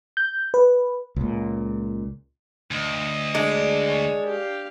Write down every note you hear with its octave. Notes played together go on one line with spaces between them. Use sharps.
G6
B4
C#2 A#2
D2 D#5
G#3 D4
C#5 A5
G4 F5